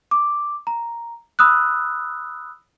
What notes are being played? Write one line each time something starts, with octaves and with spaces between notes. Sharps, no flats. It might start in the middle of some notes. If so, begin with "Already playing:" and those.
D6
A#5
B5 D#6 E6 F#6